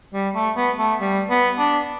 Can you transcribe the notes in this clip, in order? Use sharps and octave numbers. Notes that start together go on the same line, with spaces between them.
G3
A3
B3
A3
G3
B3
D4